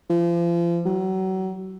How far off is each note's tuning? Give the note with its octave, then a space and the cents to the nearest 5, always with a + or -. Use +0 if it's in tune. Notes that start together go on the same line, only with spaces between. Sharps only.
F3 -35
F#3 +35